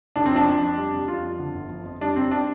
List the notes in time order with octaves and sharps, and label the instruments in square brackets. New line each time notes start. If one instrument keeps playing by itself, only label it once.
[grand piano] F1 D4
C4
F3 D4
F2
F2
G3
C3
F2 F4
F3
D3
G1
F3
F2
G3 D4
C3 C4
D4